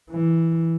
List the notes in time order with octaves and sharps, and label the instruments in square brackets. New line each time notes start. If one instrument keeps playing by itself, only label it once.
[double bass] E3